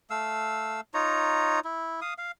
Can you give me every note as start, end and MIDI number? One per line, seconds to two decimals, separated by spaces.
0.10 0.81 57
0.10 0.81 77
0.10 0.81 88
0.94 1.60 63
0.94 1.60 65
0.94 1.60 73
0.94 1.60 82
1.65 2.00 64
2.01 2.14 77
2.01 2.14 87
2.18 2.31 77